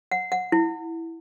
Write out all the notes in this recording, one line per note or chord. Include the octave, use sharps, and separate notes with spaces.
F#5
F#5
E4